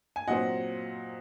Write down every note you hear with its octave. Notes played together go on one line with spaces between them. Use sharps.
G#5
A#2 F#3 C4 D#5 F#5